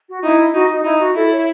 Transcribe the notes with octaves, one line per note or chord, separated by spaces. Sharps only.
F#4
D#4 E4
D#4 F#4
D#4
D#4 E4
F#4
E4 A4
C#5